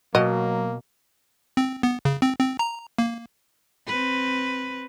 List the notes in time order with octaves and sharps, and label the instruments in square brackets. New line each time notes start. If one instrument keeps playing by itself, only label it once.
[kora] B2 [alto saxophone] F#3 [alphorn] A#3 [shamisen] D#5
[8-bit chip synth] C4
B3
C#3
C4
C4
A#5
A#3
[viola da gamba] C4 B4